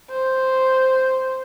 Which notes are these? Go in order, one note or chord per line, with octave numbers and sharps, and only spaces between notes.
C5